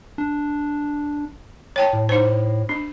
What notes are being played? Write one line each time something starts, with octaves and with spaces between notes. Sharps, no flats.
D4
C#5 G5 A5
A2
D#4 C5
D4